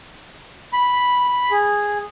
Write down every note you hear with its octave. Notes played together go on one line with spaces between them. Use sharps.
B5
G#4